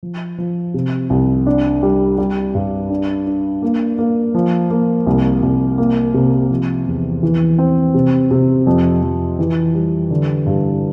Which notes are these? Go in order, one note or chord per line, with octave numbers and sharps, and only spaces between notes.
F3
F3
C3
C2
D4
G3
G3
G2
D4
D4
A#3
A#3
F3
A#3
C2
C2
A#3
C3
F3
E2
E3
C4
C3
C3
F2
F2
E3
G3
D3
G2